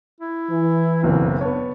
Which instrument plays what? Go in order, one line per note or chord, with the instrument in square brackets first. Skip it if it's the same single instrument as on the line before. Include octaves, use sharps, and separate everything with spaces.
[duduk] E4
[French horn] E3
[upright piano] F#1 B1 [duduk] C4
[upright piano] B3 C#5 [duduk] D4